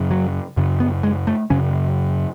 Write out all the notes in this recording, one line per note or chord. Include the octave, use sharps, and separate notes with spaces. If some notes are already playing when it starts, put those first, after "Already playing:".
Already playing: F#2 C#3
F#3
F#2 C#3
B3
G#3
A3
F#2 C#3 C#4